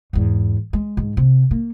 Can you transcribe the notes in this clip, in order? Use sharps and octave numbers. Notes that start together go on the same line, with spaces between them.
E2 G#2
G#3
G#2
C3
A#3